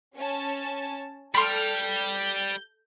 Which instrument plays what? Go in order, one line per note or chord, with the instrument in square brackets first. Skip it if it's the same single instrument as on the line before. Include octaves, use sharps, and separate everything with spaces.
[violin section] C#4 C#5 A5
[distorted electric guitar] G3 [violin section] A4 F6 [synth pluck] B5 C6
[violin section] G6